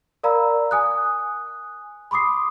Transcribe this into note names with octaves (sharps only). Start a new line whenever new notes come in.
A#4 D5 F5 A#5 B5 E6
G#5 D#6 F#6
B5 C6 D6 D#6 C7